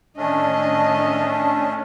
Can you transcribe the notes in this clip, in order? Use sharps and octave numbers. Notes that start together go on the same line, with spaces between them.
A2 D#3 A3 C#4 D4 D#5